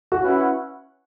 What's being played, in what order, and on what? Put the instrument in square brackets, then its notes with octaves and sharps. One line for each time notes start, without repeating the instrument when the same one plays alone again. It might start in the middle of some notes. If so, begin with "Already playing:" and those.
[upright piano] F#4
[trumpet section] C#4 E4 B4 F#5